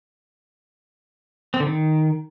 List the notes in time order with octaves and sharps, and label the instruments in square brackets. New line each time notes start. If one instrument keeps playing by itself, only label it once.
[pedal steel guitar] C4
D3
D#3